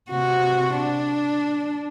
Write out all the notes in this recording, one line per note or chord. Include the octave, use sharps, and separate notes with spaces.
C3 F#4
D4